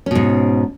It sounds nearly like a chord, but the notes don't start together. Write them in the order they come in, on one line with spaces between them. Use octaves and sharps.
C#4 B2 G#2